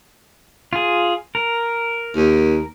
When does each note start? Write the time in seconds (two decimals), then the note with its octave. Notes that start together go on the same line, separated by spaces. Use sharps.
0.73 F4 G#4
1.35 A#4
2.16 D#2